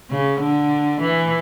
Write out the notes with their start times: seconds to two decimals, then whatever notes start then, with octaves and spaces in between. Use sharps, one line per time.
0.10 C#3
0.41 D3
1.01 E3